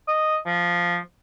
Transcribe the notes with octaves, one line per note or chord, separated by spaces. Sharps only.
D#5
F3